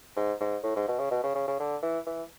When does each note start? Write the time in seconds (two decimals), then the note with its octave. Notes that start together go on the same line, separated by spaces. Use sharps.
0.16 G#2
0.40 G#2
0.63 A2
0.76 G#2
0.88 B2
0.99 C#3
1.11 B2
1.24 C#3
1.35 C#3
1.48 C#3
1.60 D3
1.82 E3
2.06 E3